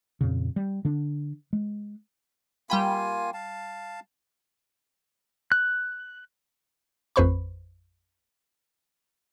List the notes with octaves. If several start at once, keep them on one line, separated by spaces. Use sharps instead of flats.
F2 A#2 C#3
G3
D3 D4
G#3
G3 A#3 F4 G5 G#5 B5
F5 A5
F#6
A1 F2 B4 C5 B5 C#6